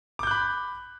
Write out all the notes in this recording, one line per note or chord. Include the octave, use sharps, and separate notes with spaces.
B5 D6 F#6 G6